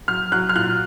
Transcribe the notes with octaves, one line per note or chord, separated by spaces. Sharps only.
F#3 F6
F#3 F#6
F6
A#2 F#6